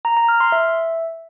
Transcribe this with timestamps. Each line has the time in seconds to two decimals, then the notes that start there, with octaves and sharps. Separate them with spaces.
0.05 A#5
0.17 A#5
0.29 F6
0.40 C6
0.52 E5